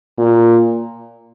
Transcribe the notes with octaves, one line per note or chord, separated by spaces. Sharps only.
A#2